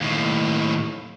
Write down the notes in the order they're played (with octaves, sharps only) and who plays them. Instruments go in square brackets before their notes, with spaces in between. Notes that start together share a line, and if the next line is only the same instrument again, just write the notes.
[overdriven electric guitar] D#2 A2